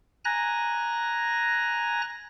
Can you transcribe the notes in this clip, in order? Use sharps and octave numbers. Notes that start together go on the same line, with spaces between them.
G#5 A#5 F#6 A#6